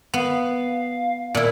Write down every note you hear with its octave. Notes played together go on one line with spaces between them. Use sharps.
B3 F5
A#2 E4